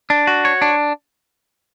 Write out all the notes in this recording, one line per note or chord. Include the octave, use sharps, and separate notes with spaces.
D4
F#4
C#5
D4